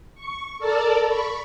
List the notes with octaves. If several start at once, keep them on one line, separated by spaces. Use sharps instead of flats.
C#6
A4 A#4 D5 A5
B5 C#6